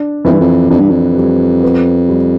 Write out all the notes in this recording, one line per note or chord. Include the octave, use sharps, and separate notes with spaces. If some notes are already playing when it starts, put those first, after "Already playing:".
Already playing: D4
F2 E3
G2
F2
F2 D4
G2
F2
G3
B3
G3